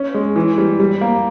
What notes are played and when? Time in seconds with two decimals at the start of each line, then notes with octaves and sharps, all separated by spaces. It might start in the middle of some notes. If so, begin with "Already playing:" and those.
Already playing: C#4
0.14 G#3
0.36 E3
0.58 G3
0.80 G3
1.01 A#3